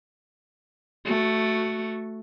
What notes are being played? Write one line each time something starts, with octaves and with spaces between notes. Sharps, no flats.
A3 F#4